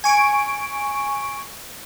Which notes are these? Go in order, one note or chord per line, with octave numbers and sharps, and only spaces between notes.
G#5 C#6 D7